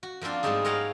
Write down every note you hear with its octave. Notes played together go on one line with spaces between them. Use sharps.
F#4
F3 A#3 C4 D4 F4
G#2 G3 G#3 C4 D#4 G#4
C4 A#4 C#5 D#5 F5 F#5